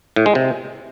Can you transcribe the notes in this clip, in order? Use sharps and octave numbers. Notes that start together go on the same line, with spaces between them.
A2
G#3
C3